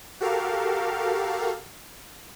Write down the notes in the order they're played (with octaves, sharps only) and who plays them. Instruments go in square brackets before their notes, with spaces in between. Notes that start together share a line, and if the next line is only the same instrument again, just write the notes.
[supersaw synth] F#4 G4 A4 A#4 F5